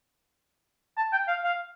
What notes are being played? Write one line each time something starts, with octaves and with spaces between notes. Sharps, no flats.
A5
G5
F5
F5